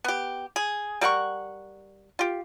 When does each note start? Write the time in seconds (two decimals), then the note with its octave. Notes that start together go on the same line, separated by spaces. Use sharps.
0.04 B3 G4
0.56 G#4
1.01 G3 A#4 F#5 C#6
2.19 F4 G4